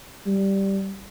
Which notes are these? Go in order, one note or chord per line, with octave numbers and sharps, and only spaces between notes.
G3